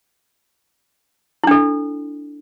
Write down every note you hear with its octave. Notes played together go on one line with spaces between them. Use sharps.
D4 E4 A4